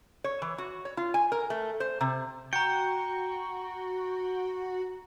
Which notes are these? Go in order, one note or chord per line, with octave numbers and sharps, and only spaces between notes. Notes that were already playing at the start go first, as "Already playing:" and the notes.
C#5
E3
F#4
C#5
F4
G#5
A#4
A3
C5
C3
F#4 G5 A#5 C#7